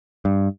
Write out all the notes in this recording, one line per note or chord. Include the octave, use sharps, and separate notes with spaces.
G2